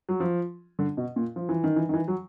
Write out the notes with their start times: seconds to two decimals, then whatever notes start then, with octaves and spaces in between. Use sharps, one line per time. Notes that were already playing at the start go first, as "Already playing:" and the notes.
0.09 F#3
0.20 F3
0.79 D3
0.97 B2
1.16 A#2
1.36 F3
1.49 E3
1.64 D#3
1.76 E3
1.89 D#3
1.94 E3
2.08 F#3